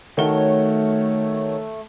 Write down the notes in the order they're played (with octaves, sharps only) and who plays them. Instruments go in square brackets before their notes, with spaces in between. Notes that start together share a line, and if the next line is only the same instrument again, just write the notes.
[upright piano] D#3 F#4 G7 [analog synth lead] A3 [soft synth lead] C#5